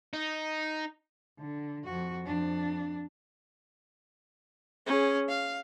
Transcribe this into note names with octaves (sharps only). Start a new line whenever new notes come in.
D#4
D3
F2 F#4
F2 D4
C#4 G#4
F5